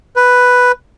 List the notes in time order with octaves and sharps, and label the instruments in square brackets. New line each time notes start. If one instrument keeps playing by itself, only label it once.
[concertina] B4